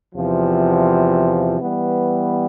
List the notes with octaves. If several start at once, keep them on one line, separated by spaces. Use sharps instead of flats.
E2 C3 F3
E3 G3 B3